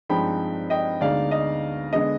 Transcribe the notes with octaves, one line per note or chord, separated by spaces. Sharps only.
G2 F3 G#3 C4 D#4 G5 B5
D#5 G5
D2 D3 G#3 B3 D#4 D5 F5
D#5
D3 G#3 B3 D#5